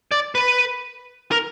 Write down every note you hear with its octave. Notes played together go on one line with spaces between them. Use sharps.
D5
B4
A#4